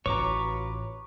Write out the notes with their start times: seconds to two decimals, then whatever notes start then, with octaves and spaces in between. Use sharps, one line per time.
0.06 A1 F4 F#4 B4 C#5 A#5 C#6 D6